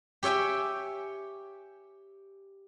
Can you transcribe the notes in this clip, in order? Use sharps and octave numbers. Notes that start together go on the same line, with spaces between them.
G4 C#5 E5 G5 G#5